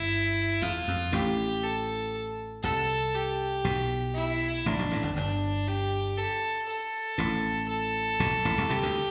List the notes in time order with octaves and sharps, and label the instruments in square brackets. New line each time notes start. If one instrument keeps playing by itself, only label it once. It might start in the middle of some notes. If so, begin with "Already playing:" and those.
Already playing: [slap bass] G1 G2 [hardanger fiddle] E4
[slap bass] E2 [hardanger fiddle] F4
[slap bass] F2
[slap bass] A1 A2 [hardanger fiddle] G4
[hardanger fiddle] A4
[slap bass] C2 C3 [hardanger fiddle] A4
[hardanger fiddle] G4
[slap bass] B1 B2
[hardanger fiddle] E4
[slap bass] A1 A2 [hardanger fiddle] D4
[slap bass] B1 B2
A1 A2
G1 G2
[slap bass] G1 G2 [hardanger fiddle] D4
[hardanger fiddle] G4
A4
A4
[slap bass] A1 A2
[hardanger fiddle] A4
[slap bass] B1 B2
A1 A2
C2 C3
[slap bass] C2 C3 [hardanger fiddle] G4
[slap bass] D2 D3